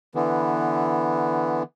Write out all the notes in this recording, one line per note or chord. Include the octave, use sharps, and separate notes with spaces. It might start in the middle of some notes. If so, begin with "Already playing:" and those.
D3 E3 B3